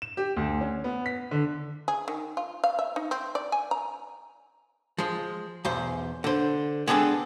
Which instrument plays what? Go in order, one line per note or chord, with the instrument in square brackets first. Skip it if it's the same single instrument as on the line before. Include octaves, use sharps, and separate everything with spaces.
[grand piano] E7
G4
D2
C#4
B3
B6
D3
[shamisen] G#4
D#3
F4
F5
E5
D#4
C4
D5
G#5
A#5
[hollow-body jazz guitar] F3 G#3
B1 E2 C5
D3 C5
G#3 B3 C4 D4 G#4 A4